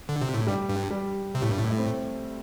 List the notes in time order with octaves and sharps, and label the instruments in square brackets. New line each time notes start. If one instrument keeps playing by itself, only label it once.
[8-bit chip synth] D3
C3
A2
[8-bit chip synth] G2 [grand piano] G3
[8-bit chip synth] G2
[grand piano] G3
[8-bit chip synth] C3
A2
G2
A2
[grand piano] A3
C4